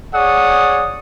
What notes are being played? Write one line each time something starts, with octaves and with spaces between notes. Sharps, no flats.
G#4 C#5 D5 F#5 D#6